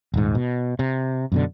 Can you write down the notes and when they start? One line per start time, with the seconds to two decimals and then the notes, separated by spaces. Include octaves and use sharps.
0.14 D#1 G#2
0.35 B2
0.79 C3
1.32 F#2 B2 D3